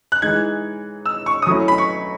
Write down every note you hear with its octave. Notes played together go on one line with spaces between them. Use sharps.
F#6
E3 G#3 D#4 G#6
E6
C#6
D#6
F#3 A3 C#4 E4 C#6
B5
C#6